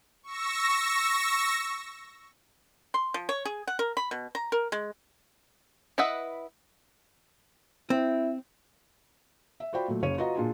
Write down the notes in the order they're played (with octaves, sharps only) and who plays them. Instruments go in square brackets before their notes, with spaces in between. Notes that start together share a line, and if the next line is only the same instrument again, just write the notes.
[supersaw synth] C#6 E6 A#6
[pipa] C6
F3
C#5
G#4
F#5
A#4
B5
B2
A#5
A#4
G#3
[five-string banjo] E4 B4 D#5 E5 F#5
[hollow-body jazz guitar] C4 [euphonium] E4
[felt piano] E5
F4 F#4 C5 D5 G5 B5
A#2 F#3 A3
F#1 C#3 C#5 D#7
F4 F#4 B4 D#5 F#5 A#5
A#2 D4 F4 G#4